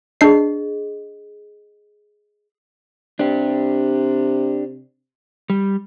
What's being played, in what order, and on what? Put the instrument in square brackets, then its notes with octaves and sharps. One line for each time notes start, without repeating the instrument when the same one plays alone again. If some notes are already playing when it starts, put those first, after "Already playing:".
[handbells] D4 C7 [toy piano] G#4 D#5
[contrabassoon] C3 [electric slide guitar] D4 G4
[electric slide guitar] G3